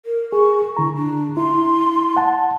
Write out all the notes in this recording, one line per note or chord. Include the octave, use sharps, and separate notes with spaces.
A#4
G#4 C#6
D3 E4 A#5
D4
E4 C6
F#5 A5